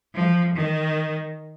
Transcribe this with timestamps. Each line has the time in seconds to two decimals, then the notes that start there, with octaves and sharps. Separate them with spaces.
0.14 F3
0.55 D#3